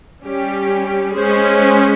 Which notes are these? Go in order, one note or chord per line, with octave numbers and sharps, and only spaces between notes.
G3 C#4 G4
G#3 C#4 G#4 C5